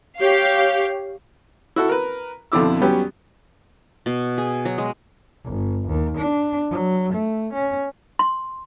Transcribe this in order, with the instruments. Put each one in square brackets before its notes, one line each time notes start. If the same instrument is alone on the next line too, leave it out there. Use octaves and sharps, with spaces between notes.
[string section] G4 C#5 F5
[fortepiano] E4 F#4 A4
A#4 B4
F2 B2 D3 E4 D6 E6
F#3 G3 B3 C#4 G4
[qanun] B2
G#4
F#3
G#3
[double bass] G1
D#2
D4
F#3
A3
C#4
[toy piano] C6